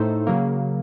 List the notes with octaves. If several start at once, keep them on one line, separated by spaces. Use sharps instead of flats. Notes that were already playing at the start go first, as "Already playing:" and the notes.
Already playing: A2 A3 D#4 A4 C5
C#3 F#3 A#3